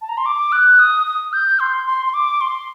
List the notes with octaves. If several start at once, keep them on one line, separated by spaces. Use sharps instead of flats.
A5
A#5
C6
D6
F#6
D#6
D#6
G6
C6
C6
C6
D6
C6